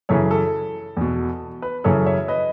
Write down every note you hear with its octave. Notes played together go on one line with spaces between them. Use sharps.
F#2 C#3 E3 A4 C#5
A4
E2 B2
B4
F#2 C#3 E3 A4 C#5
C#5 E5
B4 D#5